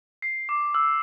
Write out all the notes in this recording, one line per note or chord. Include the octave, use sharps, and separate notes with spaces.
C7
D6
E6